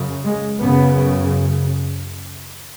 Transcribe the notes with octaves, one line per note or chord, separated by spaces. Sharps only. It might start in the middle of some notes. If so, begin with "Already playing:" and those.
Already playing: F#2 C#3
G#3
F#2 C#3 B3